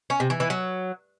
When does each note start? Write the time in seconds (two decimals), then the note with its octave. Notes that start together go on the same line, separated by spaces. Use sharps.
0.10 C#4
0.20 C3
0.30 E3
0.40 E3
0.50 F#3